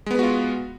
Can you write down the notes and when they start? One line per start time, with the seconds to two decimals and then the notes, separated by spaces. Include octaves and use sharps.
0.06 G#3
0.11 B3
0.15 B4
0.19 F#4
0.23 F4